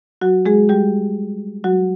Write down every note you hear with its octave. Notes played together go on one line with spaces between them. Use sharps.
F#3 F#4
G#3 G#4
G3 G4
F#3 F#4